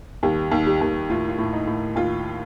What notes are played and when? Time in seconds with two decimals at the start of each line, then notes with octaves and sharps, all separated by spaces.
0.23 D#2 G3
0.51 D#2
0.67 G3
0.81 D#2
1.09 A2 F4
1.28 F4
1.38 A2
1.53 D#4
1.68 A2
1.96 D#2 F4